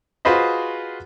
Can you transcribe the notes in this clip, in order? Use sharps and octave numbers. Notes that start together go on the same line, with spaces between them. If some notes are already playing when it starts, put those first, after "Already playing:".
F4 F#4 G#4 B4 C5 D#5